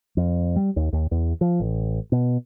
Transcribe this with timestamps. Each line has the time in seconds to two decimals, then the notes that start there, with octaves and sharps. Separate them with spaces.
0.17 F2
0.56 G3
0.76 D#2
0.93 D#2
1.11 E2
1.41 F3
1.60 A1
2.12 B2